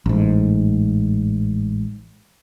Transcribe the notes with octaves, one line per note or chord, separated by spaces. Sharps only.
A1 G#2